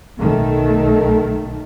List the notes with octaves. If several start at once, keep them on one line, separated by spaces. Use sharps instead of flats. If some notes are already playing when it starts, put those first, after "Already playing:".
B1 D#3 A3